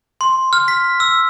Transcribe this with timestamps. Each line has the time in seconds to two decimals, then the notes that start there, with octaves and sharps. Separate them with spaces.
0.21 C6
0.53 F6
0.68 B6
1.00 E6